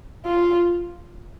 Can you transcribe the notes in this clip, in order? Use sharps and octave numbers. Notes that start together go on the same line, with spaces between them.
F4